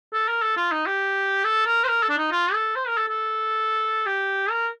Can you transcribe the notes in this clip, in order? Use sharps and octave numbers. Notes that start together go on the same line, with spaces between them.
A4
A#4
A4
F4
D#4
G4
A4
A#4
C5
A#4
A4
D4
D#4
F4
A4
C5
A#4
A4
A4
G4
A#4